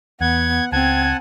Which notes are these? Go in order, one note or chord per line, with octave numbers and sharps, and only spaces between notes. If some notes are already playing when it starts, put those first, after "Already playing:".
E2 B3 F#5 G#6
C#2 C4 F#5 G#5 A5 G#6